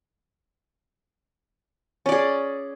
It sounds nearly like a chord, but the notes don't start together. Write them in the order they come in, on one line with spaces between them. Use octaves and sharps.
C#4 D5 G#4